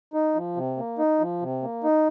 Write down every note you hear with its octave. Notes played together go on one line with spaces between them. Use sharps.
D#4
F3
C3
A#3
D#4
F3
C3
A#3
D#4